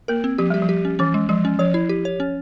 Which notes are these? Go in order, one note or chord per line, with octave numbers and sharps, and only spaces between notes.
A#3 A#4
C4
F3 G4
G3 G4
F3
G4
C#4
E3 C#4
G#3
F3 G#3
C#4
F3 C#5
E4
G4
C#5
C#4